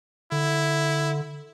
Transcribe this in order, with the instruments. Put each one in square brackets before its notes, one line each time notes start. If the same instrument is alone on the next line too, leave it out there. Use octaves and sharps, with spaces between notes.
[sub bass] D3 [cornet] E4